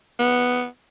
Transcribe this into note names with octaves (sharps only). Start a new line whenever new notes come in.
B3